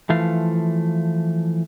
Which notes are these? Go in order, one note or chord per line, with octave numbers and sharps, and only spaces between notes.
E3 F3 A3 F5